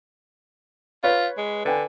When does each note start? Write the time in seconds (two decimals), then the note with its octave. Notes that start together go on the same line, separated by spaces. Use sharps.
1.04 F4 B4 C#5
1.38 G#3
1.65 D3 B4 G5 G#5